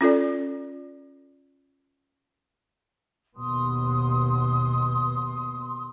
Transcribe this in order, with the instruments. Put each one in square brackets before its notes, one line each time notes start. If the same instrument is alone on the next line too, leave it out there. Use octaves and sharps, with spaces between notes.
[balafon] C#4 F4 A4 D5
[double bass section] D#2 B2 [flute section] C6 D#6